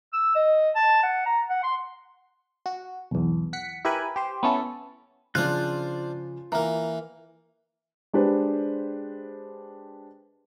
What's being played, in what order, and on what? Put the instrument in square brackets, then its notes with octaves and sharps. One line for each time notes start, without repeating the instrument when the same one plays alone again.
[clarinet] E6
D#5
A5
F#5
A#5
F#5
C6
[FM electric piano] F#4
B1 E2
F#5 B6 C#7
E4 G4 A#4 B4 G#5 B5
G4 C5
B3 C#4 E4 A4
[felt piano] C#3 F3 [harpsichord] D4 C5 F5 [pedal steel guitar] F4 F#6
[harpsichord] E3 A#3 [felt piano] A#5
[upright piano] G#3 D4 G4 B4 C5